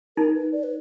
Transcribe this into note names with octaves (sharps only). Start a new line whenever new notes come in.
D#4 A#4
B4
D5
B4